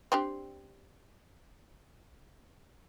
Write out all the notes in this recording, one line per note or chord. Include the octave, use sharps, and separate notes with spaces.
C4 D4 G4